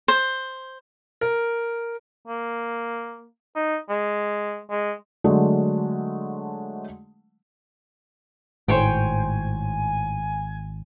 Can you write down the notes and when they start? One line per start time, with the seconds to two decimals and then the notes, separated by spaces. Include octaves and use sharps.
0.08 C5
1.21 A#4
2.27 A#3
3.56 D#4
3.89 G#3
4.70 G#3
5.24 D3 F#3 G#3 A3 D4
8.68 G#1 A2 C5 C#5 G5 G#5